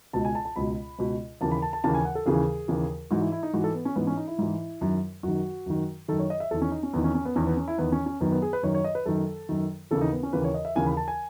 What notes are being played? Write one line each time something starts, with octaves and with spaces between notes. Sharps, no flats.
C#2 B2 A5
G#5
A5
A5
C#2 B2 B5
C#2 B2
D#2 C#3 E3 A5
B5
A5
A5
D#2 C#3 E3 A5
G#5
F#5
A4
D#2 C#3 E3 G#4
D#2 C#3 E3
G#2 E3 F#4
E4
E4
D#4
G#2 E3 F#4
A4
B3
C#4
G#2 E3 B3
C#4
D#4
E4
G#2 E3
F#2 D#3
F#2 D#3 F#4
F#2 D#3
F#2 D#3 A4
C#5
D#5
E5
E2 D#3 A4
C#4
D#4
C#4
E2 D#3 B3
C#4
C#4
B3
E2 D#3 C#4
B3
C#4
E4
E2 D#3 B3
C#4
C#4
F#2 D#3 B3
B3
G#4
B4
F#2 D#3 C#5
C#5
D#5
B4
F#2 D#3 A4
F#2 D#3
D#2 C#3 E3 A4
D#4
B3
C#4
D#2 C#3 E3 B4
C#5
D#5
E5
D#2 C#3 E3 G#5
B5
A5
G#5